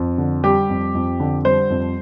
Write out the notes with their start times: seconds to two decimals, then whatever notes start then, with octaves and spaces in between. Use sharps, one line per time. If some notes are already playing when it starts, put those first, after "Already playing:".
Already playing: F2
0.18 D3
0.44 G3 G4
0.69 F2
0.94 F2
1.20 D3
1.45 G3 C5
1.70 F2